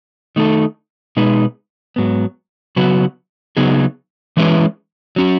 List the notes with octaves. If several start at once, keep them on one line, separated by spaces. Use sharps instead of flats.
D#3 A3 D#4 A4
B2 G#3 D#4 G#4 B4
G#2 F#3 B3
C#3 F#3 B3 F#4 B4
C#3 F#3 B3 D#4 G#4
E3 G#3 C#4 E4 B4
F#3 C#4 F#4